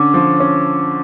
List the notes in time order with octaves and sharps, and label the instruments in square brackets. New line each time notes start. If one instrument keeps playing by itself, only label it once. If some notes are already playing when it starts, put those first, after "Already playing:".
Already playing: [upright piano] D3 C#4 [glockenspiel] D6
[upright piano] F3
C#4